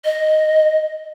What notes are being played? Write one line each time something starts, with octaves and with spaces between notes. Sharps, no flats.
D#5